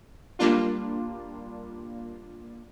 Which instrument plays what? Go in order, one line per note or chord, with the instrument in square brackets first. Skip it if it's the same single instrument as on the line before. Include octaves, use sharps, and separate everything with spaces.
[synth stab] G3 A#3 D4 F4